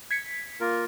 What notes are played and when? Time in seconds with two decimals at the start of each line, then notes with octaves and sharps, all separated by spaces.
0.11 G#6 B6 C#7
0.61 A#3 F4 A#4